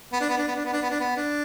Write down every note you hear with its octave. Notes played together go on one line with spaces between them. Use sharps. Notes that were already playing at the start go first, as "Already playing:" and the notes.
B3
D4
B3
D4
B3
D4
B3
D4
B3
D4
B3
D4